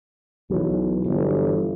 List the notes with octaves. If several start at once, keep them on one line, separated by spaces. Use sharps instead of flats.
B1 E3 F#3
G1